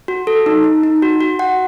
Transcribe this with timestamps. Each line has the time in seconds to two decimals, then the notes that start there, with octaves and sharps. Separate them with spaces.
0.08 F#4
0.27 A4
0.46 D#4
0.64 D#4
0.83 D#4
1.02 F#4
1.21 F#4
1.39 F#4 F#5